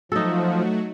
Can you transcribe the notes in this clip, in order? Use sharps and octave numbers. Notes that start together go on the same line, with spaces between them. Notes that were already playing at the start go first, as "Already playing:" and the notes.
F3 F#3 A3 D#4 F#4 A4